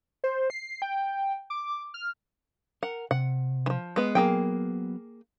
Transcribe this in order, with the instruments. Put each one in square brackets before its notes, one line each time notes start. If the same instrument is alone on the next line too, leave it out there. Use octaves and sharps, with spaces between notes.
[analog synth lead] C5
C7
G5
D6
F6
[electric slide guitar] A#4 [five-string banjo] F#5
[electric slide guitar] C3 [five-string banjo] F#5
[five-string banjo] E3 F3
G#3 B3
[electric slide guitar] F#3 B3 [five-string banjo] A#3 G#4 G5